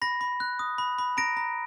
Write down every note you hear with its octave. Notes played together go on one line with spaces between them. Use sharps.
B5 A#6
B5
F#6
D#6
B5
B5
A#5 A#6 D7
A#5